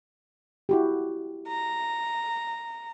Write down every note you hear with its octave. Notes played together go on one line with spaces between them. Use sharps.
E4 F#4 G4
A#5